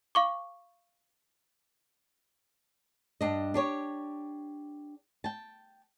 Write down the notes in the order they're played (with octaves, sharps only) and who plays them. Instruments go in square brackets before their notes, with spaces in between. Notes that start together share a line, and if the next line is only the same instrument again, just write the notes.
[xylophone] F5 C#6 D6
[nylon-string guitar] G2 D4 D#5
D4 G4 C#5
G5 A5